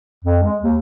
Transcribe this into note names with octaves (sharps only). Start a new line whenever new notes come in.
F2
G#3
D#2